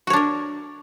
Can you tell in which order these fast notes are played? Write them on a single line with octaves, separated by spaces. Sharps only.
F#4 C#5 D4 A#4